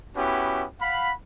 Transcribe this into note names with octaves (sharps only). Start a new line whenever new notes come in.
B3 C#4 E4 F#4 G4
F5 F#5 B5